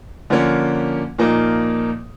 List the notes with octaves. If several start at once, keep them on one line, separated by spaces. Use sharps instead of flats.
D3 F3 A#3 C#4
A#2 F3 A#3 D#4